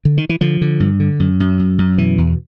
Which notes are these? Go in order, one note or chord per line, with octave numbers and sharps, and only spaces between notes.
D3
D#3
E3
D3 F3
D3
G2
D3
F#2
F#2
F#2
F#2
B2 E3
E2